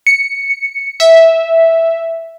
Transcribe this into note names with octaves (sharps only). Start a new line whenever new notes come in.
C#7
E5